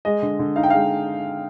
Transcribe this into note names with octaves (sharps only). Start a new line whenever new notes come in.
G#3 D#5
D3
D3
D#4 F5
G5
G#3 F5